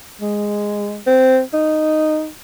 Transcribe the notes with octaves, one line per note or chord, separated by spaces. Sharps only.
G#3
C4
D#4